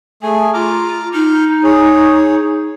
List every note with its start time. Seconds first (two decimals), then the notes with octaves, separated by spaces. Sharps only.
0.23 A3 G#4 G#5
0.53 F4 A#5 D6 F6
1.14 D#4 F6 G6
1.64 G#4 C#5